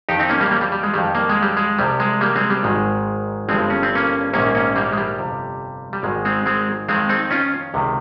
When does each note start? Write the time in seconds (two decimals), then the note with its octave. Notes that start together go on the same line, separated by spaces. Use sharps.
0.09 F2 D#3 D#4 G4
0.19 C4 D#4
0.29 A#3 C#4
0.41 G3 A#3
0.51 G3 A#3
0.61 G3
0.72 G3
0.83 G#3
0.94 F2 D#3 G3
1.15 A#3
1.29 G#3
1.42 G3
1.57 G#3
1.79 C2 C3 F3 G3
2.00 G#3
2.21 G3 A#3
2.36 G#3 C4
2.50 G3
2.63 G#1 G#2 D#3 G#3
3.49 G1 G2 F3 G#3 C4
3.70 C#4
3.83 C4
3.95 A#3 C#4
4.33 A#1 G#2 D#3 A#3 C#4
4.55 A#3 C#4
4.76 G3 A#3
4.93 G#3
4.97 G3
5.19 G1 F2 C3
5.93 G3
6.03 G#1 G#2 D#3 G#3
6.25 G#3 C4
6.46 G#3 C4
6.89 F2 D#3 G#3 C4
7.09 C4 D#4
7.31 C#4 F4
7.74 C#2 C3 D#3